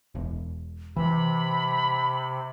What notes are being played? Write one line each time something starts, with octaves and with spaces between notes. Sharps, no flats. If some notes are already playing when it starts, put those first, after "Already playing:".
E1
C3 E3 B5